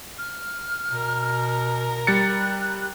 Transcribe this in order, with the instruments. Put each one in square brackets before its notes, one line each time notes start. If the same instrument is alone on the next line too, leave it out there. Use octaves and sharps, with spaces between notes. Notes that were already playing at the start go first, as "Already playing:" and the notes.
[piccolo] F6
[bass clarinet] B2 [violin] A#4
[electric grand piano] G3 A6 C#7 [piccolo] F#6